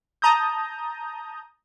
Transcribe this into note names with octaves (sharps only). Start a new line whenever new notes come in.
A5 A#5 D#6 G6